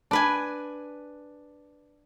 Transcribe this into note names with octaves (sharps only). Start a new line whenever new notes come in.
D4 B4 G#5